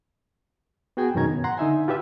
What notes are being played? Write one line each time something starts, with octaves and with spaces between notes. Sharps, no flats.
B3 F#4 G#4 G5 G#5
F#2 B2 D#3 C#4 A#5 G#6
B3
F#5 A#5 C6
D3 D#4 E5 G#5
F4 G4 B4 E5